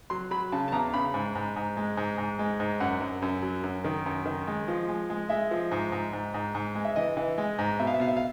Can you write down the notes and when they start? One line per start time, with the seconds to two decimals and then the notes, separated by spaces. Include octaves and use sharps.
0.10 F#3 C6
0.31 F#3 B5
0.52 C#3 A5
0.68 A5
0.72 E2 A#5
0.94 C#3 B5
1.14 G#2
1.35 G#2
1.56 G#2
1.77 G#3
1.97 G#2
2.18 G#2
2.39 G#3
2.60 G#2
2.80 F#2 F#5
3.01 F#2
3.22 F#2
3.43 F#3
3.64 F#2
3.84 D#3
4.06 F#2
4.25 D#3
4.47 G#3
4.68 F3
4.89 G#3
5.10 G#3
5.29 G#3 E5
5.51 F3
5.71 G#2
5.92 G#2
6.13 G#2
6.34 G#2
6.55 G#2
6.75 G#3
6.85 E5
6.96 E3 D#5
7.17 E3
7.38 G#3
7.59 G#2
7.80 B2 E5
7.87 F5
7.94 E5
8.00 B2 F5
8.08 E5
8.17 F5